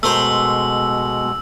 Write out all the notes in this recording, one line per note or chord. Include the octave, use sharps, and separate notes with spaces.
B2 G#3 A3 A#4 C5 E6